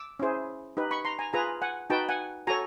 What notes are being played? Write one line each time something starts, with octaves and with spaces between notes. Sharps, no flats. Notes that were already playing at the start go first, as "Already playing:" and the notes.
Already playing: D6 E6
C#4 E4 G#4 C5
D#4 G4 B4
B5 C#6
A#5 C6
G#5 A#5
F4 G#4 B4 G#5 A#5
F#5 G#5
D#4 F#4 B4 G5 A5
F#5 G#5
F#4 A4 C#5 G#5 A#5